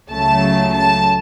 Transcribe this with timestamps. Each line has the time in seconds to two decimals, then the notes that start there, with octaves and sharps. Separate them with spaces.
0.11 C#2 C#3 F#3 A3 A5
0.75 A5